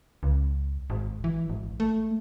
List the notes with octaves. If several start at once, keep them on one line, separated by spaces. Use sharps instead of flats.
C#2
G#1
E3
G#1
A3